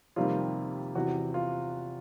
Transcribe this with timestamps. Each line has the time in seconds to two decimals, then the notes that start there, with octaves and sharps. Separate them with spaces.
0.16 F2 C3 D#3 G3 A#3 F4
0.95 E2 C3 E3 F#4
1.34 F4